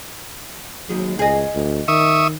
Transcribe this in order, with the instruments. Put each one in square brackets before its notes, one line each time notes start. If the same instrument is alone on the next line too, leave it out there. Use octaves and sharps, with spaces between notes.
[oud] D#2 G#3 [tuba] F#3
[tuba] C#2 [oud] G#4 D#5
[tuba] D2
[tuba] D#3 [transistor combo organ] E5 C#6 D#6